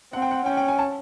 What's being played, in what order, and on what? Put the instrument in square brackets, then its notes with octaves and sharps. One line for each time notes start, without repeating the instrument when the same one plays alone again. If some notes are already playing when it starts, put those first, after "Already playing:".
[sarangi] C4 [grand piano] F#5
[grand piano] G5
F#5
[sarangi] C#4 [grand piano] G5
[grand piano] G5
G#5
A5